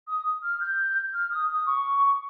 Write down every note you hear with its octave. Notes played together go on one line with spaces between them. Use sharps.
D#6
F6
G6
F6
D#6
D#6
C#6